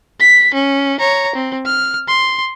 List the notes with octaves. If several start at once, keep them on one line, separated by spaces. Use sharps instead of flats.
B6
C#4
C#5 A#5
C4
F6
C6